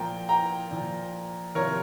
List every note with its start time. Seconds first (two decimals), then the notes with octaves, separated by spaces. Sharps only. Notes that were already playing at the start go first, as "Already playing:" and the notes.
Already playing: A#2 F3 G5 A#5
0.29 G5 A#5
0.71 A#2 F3
1.55 C3 F3 A#4 C#5